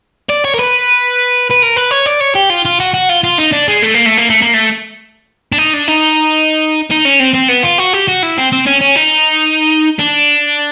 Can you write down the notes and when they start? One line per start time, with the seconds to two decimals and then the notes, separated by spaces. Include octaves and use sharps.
0.30 D5
0.45 C#5
0.54 A#4
0.59 B4
1.50 B4
1.62 A#4
1.76 B4
1.91 C#5
2.06 D5
2.21 C#5
2.35 G4
2.50 F4
2.65 F4
2.80 F#4
2.94 F#4
3.09 F4
3.24 F4
3.38 D#4
3.52 D4
3.68 G#3
3.82 A3
3.94 A#3
4.06 A3
4.18 A#3
4.30 A3
4.42 A#3
4.54 A3
5.52 D4
5.58 D#4
5.73 D4
5.88 D#4
6.91 D#4
7.05 C#4
7.20 C4
7.35 C4
7.49 B3
7.63 F4
7.79 F#4
7.94 G4
8.08 F#4
8.23 E4
8.38 C4
8.52 C4
8.67 C#4
8.81 C#4
8.96 D#4
9.99 D4